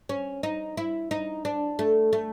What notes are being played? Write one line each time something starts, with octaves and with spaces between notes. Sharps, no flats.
C#4
D#4
E4
D#4
D4
A3
A3